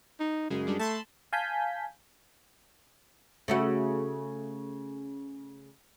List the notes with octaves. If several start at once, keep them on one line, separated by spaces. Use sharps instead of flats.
D#4
F#2 C#3 G#3
G3 G#3 D4
A3 A5 B5 C6
F5 G#5 A5 G6 B6
C#3 A3 F#4